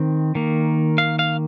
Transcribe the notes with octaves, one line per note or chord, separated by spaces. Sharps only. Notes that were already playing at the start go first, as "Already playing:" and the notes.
Already playing: D#3 C4
D#3 A#3
F5
F5